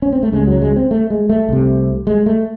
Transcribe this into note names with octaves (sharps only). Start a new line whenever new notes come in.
C#4
C4
A3
C#2 C#3 G#3
F#3
G#3
C4
A3
G#3
A3
C2 C3
G#3
A3